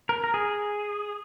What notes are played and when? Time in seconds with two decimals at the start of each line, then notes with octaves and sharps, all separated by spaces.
0.09 A#4
0.24 A#4
0.34 G#4